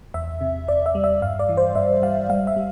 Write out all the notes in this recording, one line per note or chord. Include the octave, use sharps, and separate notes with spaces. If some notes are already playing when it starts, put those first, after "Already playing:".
E2 E5
C3
E2 D5
E5
G3
E5
G2 F5
D5
E3
C5
G2 E5
G3 F5
G3 F5
E5
G3